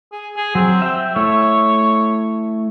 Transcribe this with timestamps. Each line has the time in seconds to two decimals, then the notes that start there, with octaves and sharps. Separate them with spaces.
0.12 G#4
0.37 G#4
0.55 F#3 C4
0.82 E5 G5
1.16 A3 E4 C#5 E5